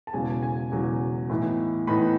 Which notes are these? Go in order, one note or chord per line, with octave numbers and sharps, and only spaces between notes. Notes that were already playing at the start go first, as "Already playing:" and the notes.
A5
E1 E2 C#3 F#3 G#5
G#5
E1 E2 C#3 F#3 G#5
A2 E3 B3 D#4
A2 E3 B3 D#4 B5